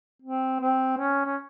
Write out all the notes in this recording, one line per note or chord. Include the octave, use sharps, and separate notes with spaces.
C4
C4
C#4
C#4